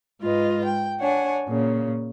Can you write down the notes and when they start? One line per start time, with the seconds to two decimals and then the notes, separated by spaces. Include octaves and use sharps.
0.21 G#2 G#3 F4 B4 D#5
0.64 G5
1.00 D4 C#5 F#5 G#5
1.49 A#2 C#3